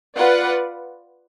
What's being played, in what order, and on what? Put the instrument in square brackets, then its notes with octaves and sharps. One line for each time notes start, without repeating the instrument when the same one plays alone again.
[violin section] F4 B4 D5 F#5